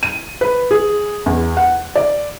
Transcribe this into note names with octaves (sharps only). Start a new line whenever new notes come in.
D#7
B4
G#4
E2
F#5
D5